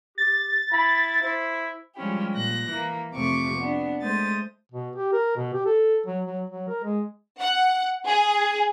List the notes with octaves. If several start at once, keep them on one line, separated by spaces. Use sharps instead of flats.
G4 A6
E4 B5
E4 C5
F3 G3 G#3 C#4 E4 G4
A#2 F#6 A#6
E3 A#3
F2 C3 A3 C#6 D6
B3 D4
G#3 A3 C5 D#6 A6
B2
G4
A#4
B2
G4
A4
F#3
F#3
F#3
A#4
G#3
F#5
G#4